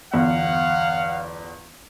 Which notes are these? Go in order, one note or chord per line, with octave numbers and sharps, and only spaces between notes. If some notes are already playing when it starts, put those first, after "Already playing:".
G1 E2 F5 F#5